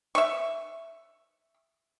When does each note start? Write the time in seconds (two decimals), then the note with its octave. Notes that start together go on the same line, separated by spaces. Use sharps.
0.15 E5 C#6